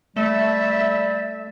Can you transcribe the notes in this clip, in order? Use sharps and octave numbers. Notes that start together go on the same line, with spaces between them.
G3 A3 E5